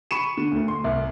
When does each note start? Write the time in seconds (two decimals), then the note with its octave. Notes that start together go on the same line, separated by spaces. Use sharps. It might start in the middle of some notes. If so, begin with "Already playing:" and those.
0.11 B5 C#6 C#7 D#7 E7
0.37 D3
0.52 D2 A3
0.68 C6
0.84 C2